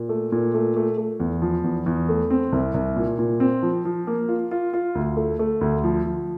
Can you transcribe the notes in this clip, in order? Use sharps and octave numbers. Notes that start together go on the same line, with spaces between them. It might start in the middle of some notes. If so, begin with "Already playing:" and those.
Already playing: A#2
A3
A#2
A3
A3
A3
E2
F3
E2
E2
A3
C4
C2
C2
A#2
A#2
C4
F3
F3
A#3
F4
F4
F4
D2
A3
A3
D2
F3
F3